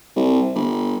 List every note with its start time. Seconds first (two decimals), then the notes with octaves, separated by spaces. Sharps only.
0.16 C2
0.55 G1